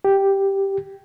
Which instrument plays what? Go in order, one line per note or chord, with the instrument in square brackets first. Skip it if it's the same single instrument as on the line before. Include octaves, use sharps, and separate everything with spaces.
[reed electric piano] G4